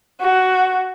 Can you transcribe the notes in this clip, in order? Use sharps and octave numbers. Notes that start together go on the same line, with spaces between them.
F#4